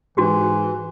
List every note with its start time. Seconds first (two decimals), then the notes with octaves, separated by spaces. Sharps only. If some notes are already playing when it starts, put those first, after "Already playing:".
0.17 G#2 E3 D4 F#4 G4